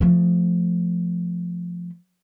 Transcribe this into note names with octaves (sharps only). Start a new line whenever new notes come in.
F3 A3